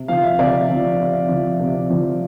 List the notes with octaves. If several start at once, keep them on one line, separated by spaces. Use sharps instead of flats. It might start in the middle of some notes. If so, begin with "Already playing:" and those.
Already playing: C3
F3 F5
E5
C3 D5
F3
C3
F3
C3
F3